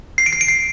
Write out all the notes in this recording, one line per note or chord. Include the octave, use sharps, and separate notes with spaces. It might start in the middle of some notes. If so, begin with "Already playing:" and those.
C7
D7
C7
D7
C7